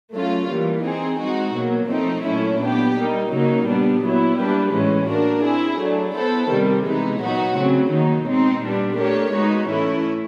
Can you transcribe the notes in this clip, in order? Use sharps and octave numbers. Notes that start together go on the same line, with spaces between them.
F#3 A3 C#4 F4
E3 G3 A#3
C4 D#4 G#4
G#3 C4 D#4 F#4
B2 F#3 A#3
F3 A3 C4 D#4
A#2 F#3 A3 C#4 E4
B3 D4 G4
G3 A#3 D#4
C#3 F#3 A#3 D#4
A#2 G3 B3 D4
F#3 B3 E4
G3 A#3 D4 G4 B4
A2 E3 G#3 C#4
A#3 D4 F#4 A#4
C4 E4 G#4
F#3 A3 D4
B3 E4 A4 C5
C3 D#3 G3
C3 E3 G#3 B3 D#4
A#2 F#3 B3 D#4 F#4
C#3 F#3 A3 C4
D#3 F#3 A#3 D#4
B2 G#3 C4 D#4
A#2 G3 B3 D4
A3 D4 G4 A#4 C#5
G#3 B3 D#4 F#4
A2 E3 A3 C#4 E4